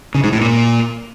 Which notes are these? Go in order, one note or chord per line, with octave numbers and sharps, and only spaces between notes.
C#3
G#2
A2
A#2